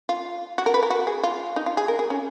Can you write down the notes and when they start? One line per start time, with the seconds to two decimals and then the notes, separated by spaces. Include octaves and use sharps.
0.09 F4
0.58 F#4
0.66 A#4
0.74 B4
0.83 A#4
0.90 F#4
1.07 G#4
1.23 F4
1.56 D#4
1.66 F4
1.77 G#4
1.88 A#4
1.99 G#4
2.10 C#4